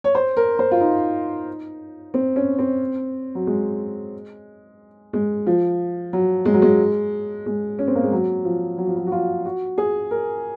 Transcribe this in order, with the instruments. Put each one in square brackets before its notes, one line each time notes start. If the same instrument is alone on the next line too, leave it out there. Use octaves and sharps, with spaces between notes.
[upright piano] C#5
C5
A#4
C5
F4
D#4
C4
C#4
C4
F#3
G#3
G#3
F3
F#3
G#3
F#3
G#3
G#3
C#4
C4
A#3
G#3
F#3
F3
F#3
F3
F#3
F#4
F4
F#4
G#4
A#4